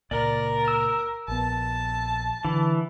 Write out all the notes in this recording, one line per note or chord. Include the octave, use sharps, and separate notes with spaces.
C#2 A#2 A#4 D5
E6
A#1 B3 A5
D3 E3